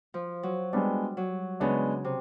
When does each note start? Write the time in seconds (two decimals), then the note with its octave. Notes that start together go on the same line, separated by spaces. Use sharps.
0.14 F3
0.43 F#3
0.73 G3 G#3 B3 D4
1.17 F#3
1.60 C#3 G#3 B3 D4
2.05 C3